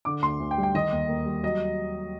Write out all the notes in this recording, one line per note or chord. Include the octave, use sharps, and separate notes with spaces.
D3 D6
D2 C6
D2
G5
G3
G5
D#3 D#5
D#2
A#3
G3
F#3 D#5